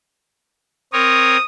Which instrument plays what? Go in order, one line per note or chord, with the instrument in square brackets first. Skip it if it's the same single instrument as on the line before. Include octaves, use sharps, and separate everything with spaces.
[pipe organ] C4 A#4 C#5 [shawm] D#6